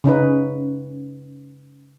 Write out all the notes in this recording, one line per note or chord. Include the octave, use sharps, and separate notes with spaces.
C#3 C#4 D#4 B4